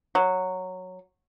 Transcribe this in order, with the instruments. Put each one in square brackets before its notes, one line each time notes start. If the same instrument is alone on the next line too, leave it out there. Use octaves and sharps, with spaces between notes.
[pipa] F#3